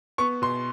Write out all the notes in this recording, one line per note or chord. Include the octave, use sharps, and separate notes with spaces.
B3 C#6
B2 C6